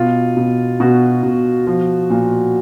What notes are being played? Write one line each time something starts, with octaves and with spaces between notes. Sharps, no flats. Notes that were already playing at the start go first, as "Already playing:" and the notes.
Already playing: B2 F4
B2
B2 F#4
B2
F3
A#2